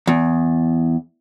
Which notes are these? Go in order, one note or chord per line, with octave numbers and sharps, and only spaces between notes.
E2